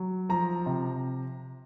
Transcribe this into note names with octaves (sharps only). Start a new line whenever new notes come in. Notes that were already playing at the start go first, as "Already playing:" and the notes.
Already playing: F#3
F3 A#5
C3